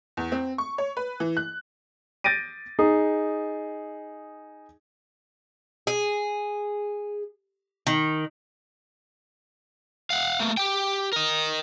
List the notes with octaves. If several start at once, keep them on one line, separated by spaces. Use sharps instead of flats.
E2
C4
C#6
C#5
B4
E3
F#6
G6 A6 A#6 D7 D#7
D#4 G#4
G#4
D#3
F5 F#5
A3 A#3
G4 G5
A#4 D#5